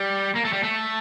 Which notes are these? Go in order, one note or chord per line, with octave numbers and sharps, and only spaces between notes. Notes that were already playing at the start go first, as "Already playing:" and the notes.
Already playing: G3
A#3
A3
G3
A3